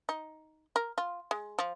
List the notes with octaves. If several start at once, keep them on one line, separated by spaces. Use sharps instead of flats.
D#4
A#4
F4
G#3
F3